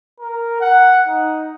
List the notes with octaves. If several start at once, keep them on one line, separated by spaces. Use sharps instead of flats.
A#4
F#5
D#4